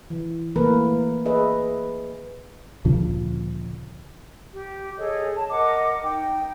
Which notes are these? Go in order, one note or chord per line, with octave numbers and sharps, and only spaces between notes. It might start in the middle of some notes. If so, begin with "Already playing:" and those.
E3
E3 A3 A#3 A#4 B4
G#4 B4 D#5 E5
D2 A#2 C#3 F3
G4
G#4 A4 C#5 D#5
A5
A#4 D#5 F#5 D6
D#4 G5